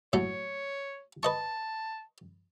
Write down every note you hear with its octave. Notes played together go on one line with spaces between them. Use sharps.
A2 F#3 A3 C#5
B4 D#5 A5 C#6